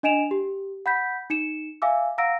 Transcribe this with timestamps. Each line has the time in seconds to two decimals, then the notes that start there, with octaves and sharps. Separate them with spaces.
0.03 D4 D#5 G#5 D7 E7 F7
0.31 G4
0.86 F#5 B5 G6 B6
1.30 D#4 C#7 E7
1.82 E5 F5 G#5 D6 E6
2.18 F5 F#5 A#5 E6 A#6 D7